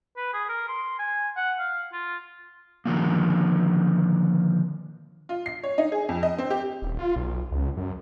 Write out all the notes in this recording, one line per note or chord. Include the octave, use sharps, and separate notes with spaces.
B4
G#4
A#4
C6
G#5
F#5
F5
F4
D3 D#3 F3 A#3
F4
C7
C#5
D#4
G#4
F2
D#5
C4
G4
D#1
F4
B1
C#2
F#2